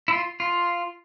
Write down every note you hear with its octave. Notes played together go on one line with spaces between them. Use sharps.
E4
F4
F4